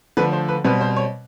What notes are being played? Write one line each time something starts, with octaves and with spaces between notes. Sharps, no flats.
D3 F3 A3 B4
C5
B4
B2 G3 C4 B4
C5
C#5